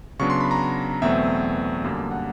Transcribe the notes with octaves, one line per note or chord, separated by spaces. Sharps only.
C#3 F#3 B3 D4 C#6
C6
B5
A#5
E2 B2 F#3 A3 C4 E5
F#2 D3 G3 A#3 D4
F#5